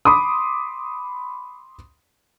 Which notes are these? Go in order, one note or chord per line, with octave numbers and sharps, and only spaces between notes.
B5 C6 D6 D#6